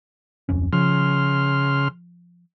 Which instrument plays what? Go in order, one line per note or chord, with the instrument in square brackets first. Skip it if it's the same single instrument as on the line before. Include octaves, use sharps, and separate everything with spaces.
[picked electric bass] D1 F2 C#4
[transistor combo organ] C#3 C6 F6 [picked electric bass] F3